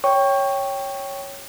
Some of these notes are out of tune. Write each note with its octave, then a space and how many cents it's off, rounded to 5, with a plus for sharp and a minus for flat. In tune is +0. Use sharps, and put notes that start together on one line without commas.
C#5 +0 G5 +0 C#6 +0